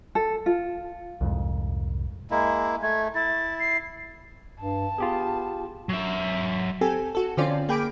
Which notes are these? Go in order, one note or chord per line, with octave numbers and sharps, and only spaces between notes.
A4
F4
C2 F2 G#2
G#3 A#3 E4
A3 G#6
E4 A6
C7
G2 A5
B3 F4 G4 G#4
F#3 E5
C4 G4 A4 G#5
F#4 A4
D3 F3 C4 C#4 F4 D5
A#3 G#4 G5 B5 D6 D7